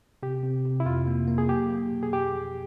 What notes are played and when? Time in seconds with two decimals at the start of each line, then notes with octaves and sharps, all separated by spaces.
0.23 C3 G4
0.43 C3
0.65 C3
0.80 E4
0.86 F2 F4
1.07 A#3
1.27 A#3
1.38 G#4
1.49 F#3 G4
1.70 A#3
1.92 B2
2.03 G#4
2.12 F2 G4
2.33 F3